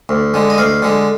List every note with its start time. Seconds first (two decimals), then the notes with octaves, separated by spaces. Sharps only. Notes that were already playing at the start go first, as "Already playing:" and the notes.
0.09 D2
0.34 D3 G#3
0.50 D#5
0.58 D2 F5
0.82 D3 G#3